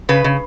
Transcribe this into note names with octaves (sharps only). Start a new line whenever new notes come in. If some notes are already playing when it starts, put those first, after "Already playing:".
C#3 B4
C#3